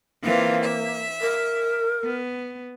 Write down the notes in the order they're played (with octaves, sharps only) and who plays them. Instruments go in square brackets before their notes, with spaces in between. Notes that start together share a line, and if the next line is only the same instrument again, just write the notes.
[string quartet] E3 C4 F4 [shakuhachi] A#3
[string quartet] E5
[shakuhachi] A#4
[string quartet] B3